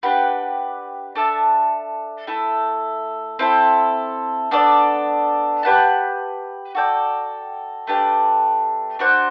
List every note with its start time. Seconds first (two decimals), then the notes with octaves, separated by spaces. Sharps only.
0.03 D4 G4 B4 F#5
1.16 D4 A4 E5 A5
2.27 A3 E4 A4
3.39 C4 E4 A4
4.51 B3 D4 A4 D5
5.63 G4 B4 F#5 A5
6.75 F#4 A4 D5 G5
7.87 A3 D4 G4 B4
8.99 D4 F#4 C5 F#5